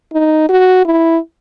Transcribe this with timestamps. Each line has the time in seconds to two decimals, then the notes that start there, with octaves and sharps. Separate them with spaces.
0.13 D#4
0.49 F#4
0.85 E4